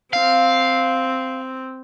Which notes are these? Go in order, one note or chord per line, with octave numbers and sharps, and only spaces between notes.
C4 F5